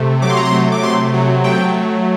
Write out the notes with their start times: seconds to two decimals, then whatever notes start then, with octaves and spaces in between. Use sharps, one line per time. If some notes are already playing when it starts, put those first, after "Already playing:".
Already playing: C3 A3
0.22 F#3 D6
0.30 C6
0.37 A#5
0.45 C6
0.52 A3
0.72 D6
0.82 C3 C6
1.14 F#3
1.44 A3 G5
1.74 F#3